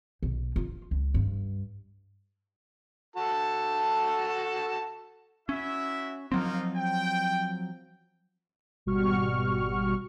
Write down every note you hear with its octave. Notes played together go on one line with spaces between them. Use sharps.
B1
F4
C#2
G2
F#4 A4 A5
C#4 E4 F#4 E5
F3 F#3 A#3 C4 D#4 F4
G5
G#1 B2 G3 F#4 C#6 F6